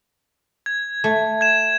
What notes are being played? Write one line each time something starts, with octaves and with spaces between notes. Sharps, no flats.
G#6
A3
G#6 E7